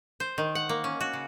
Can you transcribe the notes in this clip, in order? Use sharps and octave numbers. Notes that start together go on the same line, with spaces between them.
C5
D#3
F#5
A#3
C#4
F#4
C#3